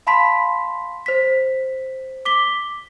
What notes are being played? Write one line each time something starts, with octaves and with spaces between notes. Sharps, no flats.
F5 A5 B5 C6 B6
C5 B6
D6 B6 G7